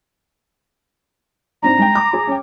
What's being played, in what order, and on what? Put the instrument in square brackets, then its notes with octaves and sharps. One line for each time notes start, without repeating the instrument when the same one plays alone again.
[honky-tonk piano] G#2 C4 D4 [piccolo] A#5
[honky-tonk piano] G#3 G5
B5 D6
G#4
C#4 G5